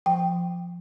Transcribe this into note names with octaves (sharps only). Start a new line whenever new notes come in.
F3 G5